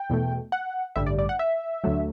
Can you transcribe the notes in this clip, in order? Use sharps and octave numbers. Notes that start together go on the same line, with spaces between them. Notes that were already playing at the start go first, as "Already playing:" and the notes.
Already playing: G5
E2 B2 A3
F#5
A1 G2 D3 G3 E5
D5
D5
F#5
E5
D2 D3 F#3 A3